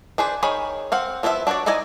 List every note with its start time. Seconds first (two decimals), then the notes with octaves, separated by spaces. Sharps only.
0.18 D4 G#4 B4 C5
0.43 D#3 G#4 C#5 B5
0.92 C4 F5 F#5
1.23 F3 B3 E4 F4 E5
1.47 D4 F#4 B4 C#5 D5
1.66 D#4 E4 D5 D#5 G#5